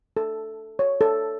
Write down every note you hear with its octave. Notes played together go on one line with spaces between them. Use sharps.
A4
C#5
A4